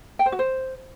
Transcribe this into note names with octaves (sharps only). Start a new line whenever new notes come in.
G5
C5
F#4
C5